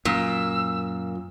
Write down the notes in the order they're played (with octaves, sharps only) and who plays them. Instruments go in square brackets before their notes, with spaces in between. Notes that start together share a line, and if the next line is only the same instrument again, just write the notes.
[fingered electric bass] F#2 [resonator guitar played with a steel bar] A#2 [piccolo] E6